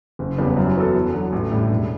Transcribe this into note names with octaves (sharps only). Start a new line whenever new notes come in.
F#1
E2 C#3 G3 B3
F#2
E3 B3 F#4 A4
E2
D3 F#3
A1
A2 G3
E1